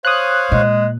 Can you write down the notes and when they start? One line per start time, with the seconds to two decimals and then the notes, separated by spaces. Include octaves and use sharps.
0.05 C5 C#5 F5 D#6 F#6
0.52 A#2 G#3